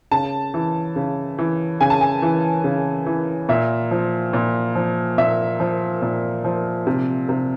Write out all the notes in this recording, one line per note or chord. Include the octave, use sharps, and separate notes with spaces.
C#3 A5
E3
C#3
E3
C#3 G#5
A5
G#5
E3
C#3
E3
A#2 E5
F3
A#2
F3
A#2 E5
F3
A#2
F3
C3
C3